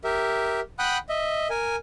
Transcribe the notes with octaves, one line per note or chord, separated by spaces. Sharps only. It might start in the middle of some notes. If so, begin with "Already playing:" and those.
G4 A#4 E5
F#5 G5 B5 D#6 F#6
D#5 E5
A#4 G#5